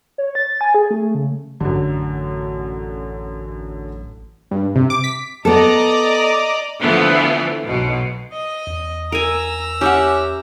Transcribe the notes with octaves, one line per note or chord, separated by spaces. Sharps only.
C#5
A6
G#5
G#4
A3
C#3
A1 F#2 D3
G2
C3
D6
B6
B3 A4 D5 D#5 A#5
D3 E3 F3 A3 B3
B1 B2
D#5
E2
A#4 G#5 A#5 E6
C#4 G4 E5 F#5